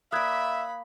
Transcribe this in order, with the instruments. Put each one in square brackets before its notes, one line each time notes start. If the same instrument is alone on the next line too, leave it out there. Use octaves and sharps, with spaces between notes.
[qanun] A#3 D5 [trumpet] E5 [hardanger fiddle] B5 [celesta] D#6 F#6 G#6